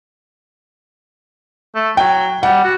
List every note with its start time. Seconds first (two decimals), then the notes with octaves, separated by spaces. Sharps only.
1.75 A3
1.97 F#3 G5
2.43 G3 F#5
2.64 F#4